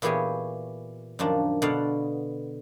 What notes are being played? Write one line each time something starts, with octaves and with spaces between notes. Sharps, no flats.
A#2 E3 B3 G4 G#4 C#5
F#2 D#3 F3 D4
B2 D3 B3 D5 F5 F#5